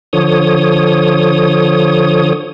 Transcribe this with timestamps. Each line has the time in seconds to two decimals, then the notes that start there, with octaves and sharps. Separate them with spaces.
0.13 D3 F3 C#5 D#6